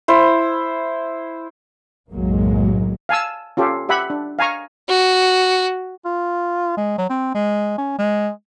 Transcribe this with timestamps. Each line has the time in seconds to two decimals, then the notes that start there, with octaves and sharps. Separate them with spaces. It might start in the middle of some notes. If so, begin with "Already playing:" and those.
0.08 E4 C5
2.12 F#1 B1 A2 F#3 G#3 A#3
3.09 F5 G#5 A5 E6
3.57 C#4 F4 G4 A4
3.89 G4 E5 F#5 B5
4.10 D4
4.39 F5 G#5 A#5 C#6
4.89 F#4
6.05 F4
6.77 G#3
6.98 F#3
7.10 C4
7.35 G#3
7.78 C#4
7.99 G#3